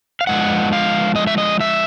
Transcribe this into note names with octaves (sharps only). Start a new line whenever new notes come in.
F5
D3 F3 G#3 B3 F#5
F5
D#5
E5
D#5
E5